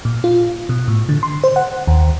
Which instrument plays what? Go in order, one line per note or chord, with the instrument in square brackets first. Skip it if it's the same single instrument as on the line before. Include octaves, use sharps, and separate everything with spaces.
[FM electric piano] A#2
F4
B2
A2
D3
C6
C5
F#5
D#2